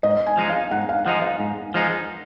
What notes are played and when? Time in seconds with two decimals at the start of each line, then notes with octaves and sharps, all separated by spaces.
0.03 G#2 D#5
0.26 G#5
0.37 F3 G#3 D#4
0.49 F5
0.71 G#2 F#5
0.89 F5
1.05 F3 G#3 D#4 F#5
1.22 F5
1.40 G#2
1.74 F3 G#3 D#4